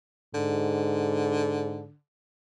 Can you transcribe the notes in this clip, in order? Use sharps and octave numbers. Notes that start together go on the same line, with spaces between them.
G#2 D3